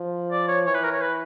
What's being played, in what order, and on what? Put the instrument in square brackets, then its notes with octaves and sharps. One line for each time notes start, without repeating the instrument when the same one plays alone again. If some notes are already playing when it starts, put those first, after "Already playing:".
Already playing: [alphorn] F3
[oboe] D5
C#5
[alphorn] E3 [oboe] C#5
[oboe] B4
A#4
C#5
B4